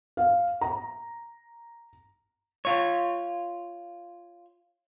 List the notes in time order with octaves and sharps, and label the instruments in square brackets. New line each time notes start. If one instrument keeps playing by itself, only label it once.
[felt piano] F5
A#5
[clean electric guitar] F4 C#5